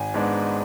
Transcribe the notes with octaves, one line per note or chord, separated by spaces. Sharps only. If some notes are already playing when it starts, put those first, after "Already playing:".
Already playing: G#1 G#5
G#2 G#3 B3 D4